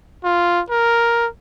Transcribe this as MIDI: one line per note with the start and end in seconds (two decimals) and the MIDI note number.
0.24 0.62 65
0.70 1.28 70